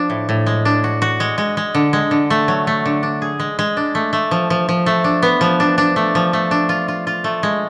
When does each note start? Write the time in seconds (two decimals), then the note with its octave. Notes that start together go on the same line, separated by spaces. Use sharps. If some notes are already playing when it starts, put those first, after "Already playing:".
Already playing: F3 D4
0.10 A2
0.29 A2
0.46 G#3
0.65 D4
0.84 F#4
1.02 F#4
1.20 G#3
1.38 G#3
1.57 G#3
1.75 D3
1.93 G#3
2.11 D3
2.30 A3
2.48 F#3
2.67 A3
2.85 D3
3.03 D4
3.22 G#4
3.40 G#3
3.59 G#3
3.77 D4
3.95 A3
4.13 A3
4.31 F3
4.50 F3
4.69 F3
4.86 A3
5.04 D4
5.22 B3
5.41 F3
5.60 D4
5.78 D4
5.96 A3
6.15 F3
6.33 A3
6.51 D4
6.69 F4
6.88 F4
7.07 F4
7.24 A3
7.43 G#3